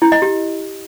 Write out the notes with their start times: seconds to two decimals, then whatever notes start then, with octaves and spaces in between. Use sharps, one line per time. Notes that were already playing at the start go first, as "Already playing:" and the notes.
0.02 E4
0.12 D#5
0.22 G4